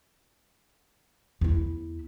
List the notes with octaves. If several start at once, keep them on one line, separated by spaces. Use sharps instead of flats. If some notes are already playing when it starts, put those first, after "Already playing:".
E2 E4